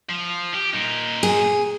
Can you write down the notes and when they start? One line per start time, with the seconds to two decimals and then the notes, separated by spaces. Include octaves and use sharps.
0.10 F3
0.54 G4
0.73 A#2 D#4
1.23 G#4